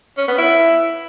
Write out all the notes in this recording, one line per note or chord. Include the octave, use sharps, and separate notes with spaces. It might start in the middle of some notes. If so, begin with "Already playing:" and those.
C#4
B3
E4